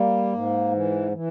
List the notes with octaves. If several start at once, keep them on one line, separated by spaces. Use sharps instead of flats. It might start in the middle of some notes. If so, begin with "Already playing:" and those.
Already playing: G3 A#3
G#2
E3
E3